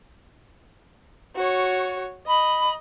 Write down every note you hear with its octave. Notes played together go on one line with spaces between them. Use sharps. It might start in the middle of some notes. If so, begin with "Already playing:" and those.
F#4 C#5
D#5 B5